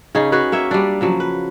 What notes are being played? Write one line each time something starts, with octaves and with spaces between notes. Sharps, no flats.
C#3 C#4 D#4 G#4
B3 F#4 G#4 B4
A#3 C#5 E5
G3 D4
C#3 F3 F#3
B4